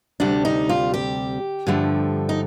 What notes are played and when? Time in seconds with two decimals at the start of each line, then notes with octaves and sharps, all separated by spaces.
0.20 D2 C3 G3 D4
0.45 D#4
0.69 F4
0.94 G4
1.67 G2 D3 F3 A3
2.29 D#4